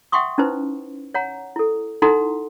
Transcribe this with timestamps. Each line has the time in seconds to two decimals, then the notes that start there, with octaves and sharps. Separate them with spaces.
0.12 E5 F#5 G5 C6 C#6 D#6
0.38 C#4 D#4 E4 B4 C5
1.14 C#5 F#5 A#5
1.56 E4 A4
2.02 D#4 E4 A4 F#5 A#5 C6